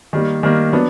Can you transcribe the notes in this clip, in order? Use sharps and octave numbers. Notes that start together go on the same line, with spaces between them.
D#3 G3 A#3
D#3 G3 A#3
F#3 B3 D4